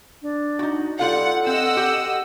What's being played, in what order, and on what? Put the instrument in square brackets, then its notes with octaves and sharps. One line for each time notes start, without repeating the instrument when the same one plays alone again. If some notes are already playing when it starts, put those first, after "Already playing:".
[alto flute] D4
[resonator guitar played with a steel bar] D#4 F#4
[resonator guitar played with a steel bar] G3 F4 F5 [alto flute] A4 [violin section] F#5
[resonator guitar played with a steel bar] C4 [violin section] D#5 F#5 E6
[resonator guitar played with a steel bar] G4